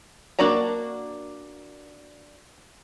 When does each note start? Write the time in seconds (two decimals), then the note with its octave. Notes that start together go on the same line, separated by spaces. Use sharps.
0.39 A#3 D4 F#4 D5 A#5